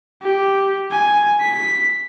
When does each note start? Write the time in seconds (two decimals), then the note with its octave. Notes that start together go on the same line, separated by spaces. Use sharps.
0.22 G4
0.91 G#5
1.41 B6